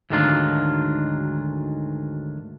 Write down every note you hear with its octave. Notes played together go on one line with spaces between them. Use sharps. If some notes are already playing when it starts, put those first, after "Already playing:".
D2 G#2 D#3 F#3 D4 F4